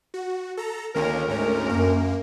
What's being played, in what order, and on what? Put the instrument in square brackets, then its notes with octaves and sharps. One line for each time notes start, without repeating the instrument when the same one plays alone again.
[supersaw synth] F#4
A4 A#5
[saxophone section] D2 A#4 [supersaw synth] D#3 A#3 C#4
[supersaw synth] G#2 A3 C#4
[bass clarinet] F#2 [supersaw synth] A#3